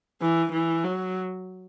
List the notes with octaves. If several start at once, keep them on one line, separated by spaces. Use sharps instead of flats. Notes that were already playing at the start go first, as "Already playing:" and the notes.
E3
E3
F#3